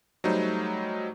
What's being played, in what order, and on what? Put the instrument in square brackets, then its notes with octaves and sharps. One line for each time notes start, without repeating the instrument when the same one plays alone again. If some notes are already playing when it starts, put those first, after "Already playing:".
[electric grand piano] F#3 G3 A3 D#4 C5